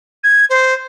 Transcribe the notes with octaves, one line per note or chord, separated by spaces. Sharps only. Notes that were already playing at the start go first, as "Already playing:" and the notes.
G#6
C5